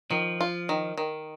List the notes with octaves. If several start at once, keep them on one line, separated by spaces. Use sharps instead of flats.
D#3 F3
F4
D#3
D#3